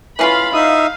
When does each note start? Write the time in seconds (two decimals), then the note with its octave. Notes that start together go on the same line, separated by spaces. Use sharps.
0.19 E3 C#4 F4 F5 B5
0.54 D#4 E5 F5 D#6